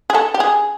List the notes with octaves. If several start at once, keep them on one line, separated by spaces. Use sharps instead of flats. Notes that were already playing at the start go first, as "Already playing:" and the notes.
G#4
A4
G4
G#4